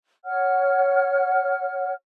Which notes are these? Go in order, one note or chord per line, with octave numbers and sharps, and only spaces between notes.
C#5 F#5 F6